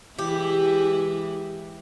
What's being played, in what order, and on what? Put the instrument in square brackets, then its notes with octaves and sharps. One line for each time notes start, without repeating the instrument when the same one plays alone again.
[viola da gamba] E3 G#3 E4 [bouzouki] G4